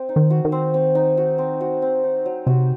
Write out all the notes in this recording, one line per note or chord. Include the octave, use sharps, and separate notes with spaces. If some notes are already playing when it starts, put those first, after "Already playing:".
Already playing: C4
D#4
D#3
F#4
D#3
C4
C4
D#4
F#4
C4
F#4
C4
D#4
F#3
C3 F#4